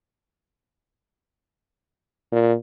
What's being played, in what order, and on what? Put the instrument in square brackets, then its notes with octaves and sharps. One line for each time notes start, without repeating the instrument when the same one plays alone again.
[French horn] A#2